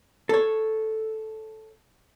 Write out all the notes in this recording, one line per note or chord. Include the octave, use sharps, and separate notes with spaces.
A4 C#5